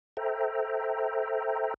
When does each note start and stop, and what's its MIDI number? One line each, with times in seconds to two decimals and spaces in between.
0.17 1.74 69
0.17 1.74 72
0.17 1.74 76
0.17 1.74 79
0.17 1.74 82